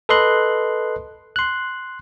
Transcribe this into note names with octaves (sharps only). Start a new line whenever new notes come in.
A4 B4 D#5 C6 F#6
C6 F#6